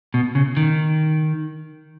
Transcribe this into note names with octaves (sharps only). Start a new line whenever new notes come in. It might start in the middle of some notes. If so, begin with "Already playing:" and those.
B2
C#3
D#3